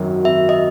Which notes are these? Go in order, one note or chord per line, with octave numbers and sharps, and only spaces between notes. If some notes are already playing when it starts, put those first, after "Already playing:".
Already playing: G#1 F#2 D#3 F#3
G#1 E5
D#5